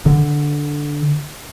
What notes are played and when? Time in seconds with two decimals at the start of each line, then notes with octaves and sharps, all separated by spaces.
0.06 D3